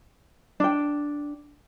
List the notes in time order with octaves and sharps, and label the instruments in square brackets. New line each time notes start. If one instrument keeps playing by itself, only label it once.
[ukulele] D4 G5